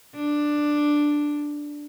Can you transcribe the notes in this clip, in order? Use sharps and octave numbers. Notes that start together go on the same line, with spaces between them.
D4